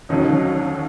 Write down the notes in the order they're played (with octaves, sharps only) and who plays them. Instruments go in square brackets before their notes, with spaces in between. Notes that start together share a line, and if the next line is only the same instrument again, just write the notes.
[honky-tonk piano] F1 D#2 D3 F#3 [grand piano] C#4 D#4